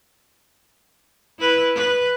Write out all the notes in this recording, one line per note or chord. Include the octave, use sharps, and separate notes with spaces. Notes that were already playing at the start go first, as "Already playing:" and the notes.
E4 B4
B4